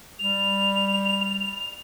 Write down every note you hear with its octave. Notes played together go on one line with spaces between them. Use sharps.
G3 F7